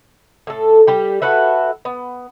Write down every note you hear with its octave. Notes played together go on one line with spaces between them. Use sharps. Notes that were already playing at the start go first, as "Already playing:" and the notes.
A2 A4
G3 G4
F#4 A4 B4 E5
B3